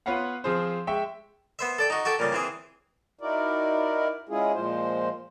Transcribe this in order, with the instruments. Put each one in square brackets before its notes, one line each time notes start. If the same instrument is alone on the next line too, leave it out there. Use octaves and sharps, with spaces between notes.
[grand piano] B3 F4 B4 C#5 F5 F#5
F3 C4 F4 G#4 C5
G#3 E5 G5 C#6
[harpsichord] B3 C5 E5
A4 D5 G5
D#4 F#4
F#4 G4 A4 G5
A#2 C#3 G3
E3 C4 G#4
[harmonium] D#4 E4 F#4 A#4 D5
G#3 C#4 E4 F4 G#4
A#2 F3 G#3 C5